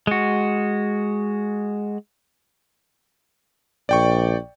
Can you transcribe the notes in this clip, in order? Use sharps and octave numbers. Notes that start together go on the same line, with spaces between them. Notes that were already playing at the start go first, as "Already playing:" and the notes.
G#3 F#4
A#1 D5 G5 C#6